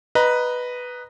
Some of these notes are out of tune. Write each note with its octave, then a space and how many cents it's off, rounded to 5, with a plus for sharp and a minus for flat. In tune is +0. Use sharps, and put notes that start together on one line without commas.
B4 +0 D#5 -10 A#5 +20